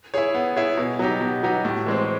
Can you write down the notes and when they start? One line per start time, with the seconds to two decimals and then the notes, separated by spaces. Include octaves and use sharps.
0.14 E4 G#4 C#5
0.34 B3
0.56 E4 G#4 C#5
0.77 B2
0.99 F#3 B3 D#4 G4
1.21 B2
1.43 F#3 B3 D#4 G4
1.65 A2
1.86 E3 G#3 C4